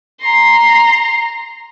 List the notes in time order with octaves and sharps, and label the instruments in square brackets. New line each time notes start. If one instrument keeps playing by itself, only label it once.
[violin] A#5 C6